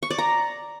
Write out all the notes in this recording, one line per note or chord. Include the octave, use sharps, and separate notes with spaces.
C#6
D5
A#5